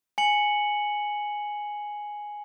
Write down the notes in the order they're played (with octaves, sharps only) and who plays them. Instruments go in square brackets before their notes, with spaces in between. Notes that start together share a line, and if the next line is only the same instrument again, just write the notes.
[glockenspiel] G#5 C#7 F#7